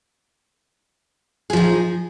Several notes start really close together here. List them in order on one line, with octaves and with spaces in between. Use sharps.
G#4 F3 D#4